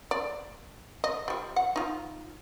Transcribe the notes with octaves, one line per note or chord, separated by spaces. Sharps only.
D5
D#5
F3 G3
F#5
D#4 F4